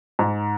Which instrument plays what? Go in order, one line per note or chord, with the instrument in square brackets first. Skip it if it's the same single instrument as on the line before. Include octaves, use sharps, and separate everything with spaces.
[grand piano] G#2